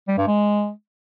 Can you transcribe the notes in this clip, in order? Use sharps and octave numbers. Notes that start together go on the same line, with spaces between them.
G3
G2
G#3